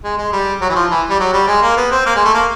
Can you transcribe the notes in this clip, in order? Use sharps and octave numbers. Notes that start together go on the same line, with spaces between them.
G#3
G#3
G3
F#3
E3
F3
E3
G3
F#3
G3
G#3
A#3
B3
C4
A#3
G#3
A3
A#3